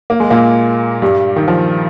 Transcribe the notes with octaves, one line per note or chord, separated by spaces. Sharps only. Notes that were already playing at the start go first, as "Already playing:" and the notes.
A#3
G#3
A#2 A#3
G2 G3
D#3
F3